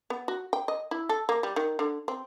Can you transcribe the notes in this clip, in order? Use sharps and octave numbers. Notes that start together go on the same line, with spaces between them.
B3
F#4
G5
D#5
E4
A4
A#3
G3
D#3
D3
C4